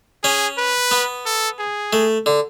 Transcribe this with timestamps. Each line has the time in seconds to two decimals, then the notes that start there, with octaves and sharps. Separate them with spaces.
0.24 C#4 G#4
0.58 B4
0.91 B3
1.26 A4
1.59 G#4
1.93 A3
2.26 D3